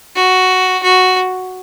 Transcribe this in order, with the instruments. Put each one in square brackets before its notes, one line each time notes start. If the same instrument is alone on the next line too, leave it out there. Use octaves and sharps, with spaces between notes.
[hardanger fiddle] F#4
F#4